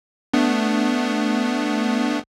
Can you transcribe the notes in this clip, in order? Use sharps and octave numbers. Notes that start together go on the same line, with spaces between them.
A3 B3 D4